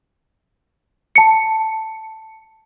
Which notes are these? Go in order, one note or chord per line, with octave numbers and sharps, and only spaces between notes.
A5 C#7